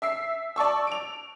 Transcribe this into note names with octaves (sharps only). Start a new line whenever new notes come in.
E5 E6 C7
D5 A5 C#6 E6
D7 F7